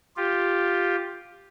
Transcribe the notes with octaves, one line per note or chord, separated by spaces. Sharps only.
F4 G4